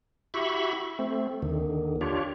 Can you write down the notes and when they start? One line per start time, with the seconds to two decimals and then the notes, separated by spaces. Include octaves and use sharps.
0.34 E4 F#4 G4 E5 B5 C#6
0.99 A3 C4
1.42 D#2 D3 D#3
2.01 D4 F4 G4 C#5